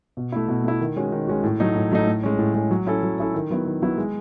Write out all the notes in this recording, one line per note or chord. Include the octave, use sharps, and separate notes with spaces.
B2
A3 E4
B2
A3 E4
D#3
G#3 C#4 F#4
D#3
G#3 C#4 F#4
A2
F#3 A3 D#4
A2
F#3 A3 D#4
A2
G#3 C#4
A2
G#3 C#4
F#3
C#4 E4 A4
F#3
C#4 E4 A4
D#3
F#3 B3 E4
D#3
F#3 B3 E4
G#3